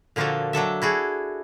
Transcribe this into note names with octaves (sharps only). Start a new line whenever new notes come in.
A#2 D3 F3 A#3 F#4 A4
F#3 D4 A4 E5
E4 F#4 G#4 A4